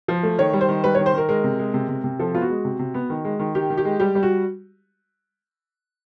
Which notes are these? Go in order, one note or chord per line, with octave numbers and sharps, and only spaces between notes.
F3
A3
D#3 C#5
G3
C5
D#3
G3 B4
D#3 C#5
C5
D#3 A#4
G#3 A#4
C3
G#3
C3
C3
C3
F3 A4
B3 F4
F#4
G#3
C3
C3
B3
D#3
G#3
D#3
D#3 G4
D#3
G4
G#3
G3 G4
G3
F#4